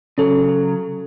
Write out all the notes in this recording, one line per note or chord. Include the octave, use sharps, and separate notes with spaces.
C#3 F#3 C#4 A4